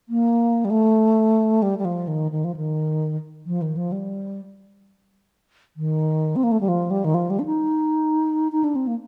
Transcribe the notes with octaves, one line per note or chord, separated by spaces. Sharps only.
A#3
G3
A3
G3
G3
F3
D#3
D#3
F3
D#3
F3
D#3
F3
G3
D#3
C4
A#3
A3
G3
F3
G3
D#3
F3
G3
D4
D#4
D#4
D4
C4
A#3